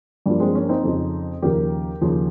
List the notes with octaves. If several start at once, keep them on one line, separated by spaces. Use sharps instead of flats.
G2 F3 G3 A#3
G#3 C4
A#3 C#4
C4 D#4
F2 C#3 F3
D#2 C#3 F3 G4 A#4
D#2 C#3 F3